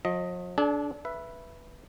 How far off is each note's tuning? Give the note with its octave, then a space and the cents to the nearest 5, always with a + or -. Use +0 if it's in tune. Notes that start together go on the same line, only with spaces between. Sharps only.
F3 +45 D#5 +10
D4 -15 A4 -45 G#5 +20
B4 -5 E5 +15